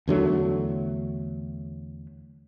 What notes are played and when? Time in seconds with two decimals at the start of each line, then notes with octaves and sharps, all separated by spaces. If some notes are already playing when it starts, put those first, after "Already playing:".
0.08 E2 D3 F#3 A3